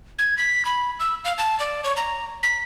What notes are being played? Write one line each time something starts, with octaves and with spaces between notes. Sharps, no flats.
G#6
B6
B5
E6
F5
A5
D5
C#5
A#5
B6